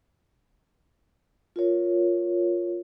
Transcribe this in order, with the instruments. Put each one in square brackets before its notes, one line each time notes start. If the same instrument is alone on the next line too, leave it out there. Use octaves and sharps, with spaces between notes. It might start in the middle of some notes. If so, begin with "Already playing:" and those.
[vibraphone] F4 A#4 C#5